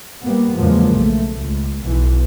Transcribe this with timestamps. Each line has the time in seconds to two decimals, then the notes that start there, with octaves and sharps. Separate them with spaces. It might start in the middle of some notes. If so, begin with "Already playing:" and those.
0.22 G3 A#3 B3
0.56 E2 C#3 F3 F#3 G#3 A#3
0.93 B1 A3
1.37 C#2
1.83 B1 E3